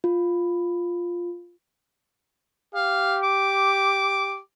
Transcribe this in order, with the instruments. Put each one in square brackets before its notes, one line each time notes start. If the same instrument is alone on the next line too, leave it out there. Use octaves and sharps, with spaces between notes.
[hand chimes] F4
[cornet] G4 [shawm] F5
[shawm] D6